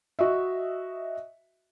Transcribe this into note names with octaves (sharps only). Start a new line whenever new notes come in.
F#4 D#5 E5